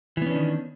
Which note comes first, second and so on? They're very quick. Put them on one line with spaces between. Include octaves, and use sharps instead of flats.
E3 B3 C#4 D4 D#3